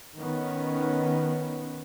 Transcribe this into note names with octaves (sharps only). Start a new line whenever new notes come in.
D#3 B3 C#4